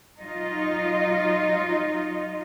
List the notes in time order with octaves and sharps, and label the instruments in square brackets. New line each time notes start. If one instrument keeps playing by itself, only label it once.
[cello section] F#3 D#4 F4 D#5